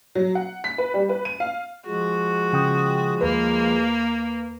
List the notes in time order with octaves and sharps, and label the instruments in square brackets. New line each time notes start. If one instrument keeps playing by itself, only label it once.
[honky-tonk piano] F#3
F#5
B6
B4
G3
B4
D#7
F5
[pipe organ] F3 G#3 [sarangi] F#4
[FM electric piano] C#3 G5 D#6
[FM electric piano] D#2 B4 [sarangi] A#3